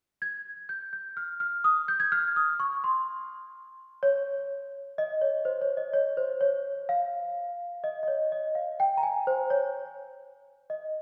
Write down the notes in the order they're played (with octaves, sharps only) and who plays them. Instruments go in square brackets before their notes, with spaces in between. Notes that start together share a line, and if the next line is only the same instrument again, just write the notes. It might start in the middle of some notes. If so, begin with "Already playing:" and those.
[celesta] G#6
G6
G6
F6
F6
D#6
G6
G#6
F6
D#6
C#6
C6
C#5
D#5
C#5
C5
C#5
D#5
C#5
C5
C#5
F5
D#5
D#5
C#5
D#5
F5
G5
A#5
G#5
C5
C#5
D#5